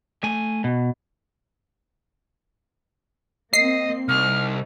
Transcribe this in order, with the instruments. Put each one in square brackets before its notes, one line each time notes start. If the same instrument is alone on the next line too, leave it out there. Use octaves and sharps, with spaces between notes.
[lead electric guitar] A3 G#5
B2
[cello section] A#3 C4 [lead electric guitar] D#5 [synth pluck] C7
[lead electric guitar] C2 [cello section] D#4 [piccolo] F6